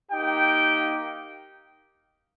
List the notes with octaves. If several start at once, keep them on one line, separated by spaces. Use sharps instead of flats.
A#3 D#4 G4 G5